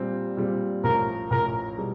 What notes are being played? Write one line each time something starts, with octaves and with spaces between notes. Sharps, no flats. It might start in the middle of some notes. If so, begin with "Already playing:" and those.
Already playing: A#2 G3 C4
A#2 G3 C4
A1 A2 F3 A#4
A1 A2 F3 A#4
B2 G3